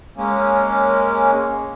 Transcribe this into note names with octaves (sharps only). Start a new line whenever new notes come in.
G#3 A#3 C#4